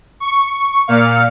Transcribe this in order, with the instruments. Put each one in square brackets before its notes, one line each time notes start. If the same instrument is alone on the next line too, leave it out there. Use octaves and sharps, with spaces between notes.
[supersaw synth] C#6
A#2 F5 C#7